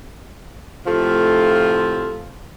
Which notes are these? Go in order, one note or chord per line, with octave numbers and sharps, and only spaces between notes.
A2 C3 F3 A3 F4